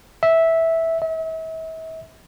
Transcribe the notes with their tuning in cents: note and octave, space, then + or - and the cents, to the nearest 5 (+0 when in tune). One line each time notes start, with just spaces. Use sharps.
E5 -10
E5 -40